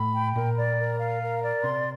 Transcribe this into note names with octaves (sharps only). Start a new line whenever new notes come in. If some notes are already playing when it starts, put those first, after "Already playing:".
Already playing: A2 B5
G5
A#2 A#4
D5
A#4
F5
A#4
D5
C3 C6